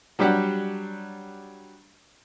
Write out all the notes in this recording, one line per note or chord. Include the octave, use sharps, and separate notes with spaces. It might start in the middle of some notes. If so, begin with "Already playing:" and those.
F#3 G3 D4 G4 F#5